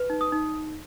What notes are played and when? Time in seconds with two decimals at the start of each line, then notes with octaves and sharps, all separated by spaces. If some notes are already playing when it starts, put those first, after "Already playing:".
Already playing: B4
0.10 D#4
0.21 D#6
0.32 D#4